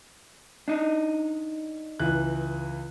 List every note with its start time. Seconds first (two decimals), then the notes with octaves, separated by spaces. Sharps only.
0.68 D4 D#4
2.00 C#2 E3 F#6